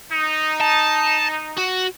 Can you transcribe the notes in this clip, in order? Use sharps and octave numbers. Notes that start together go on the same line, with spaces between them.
D#4
A5
F#4